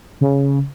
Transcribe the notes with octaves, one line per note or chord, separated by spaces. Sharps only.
C#3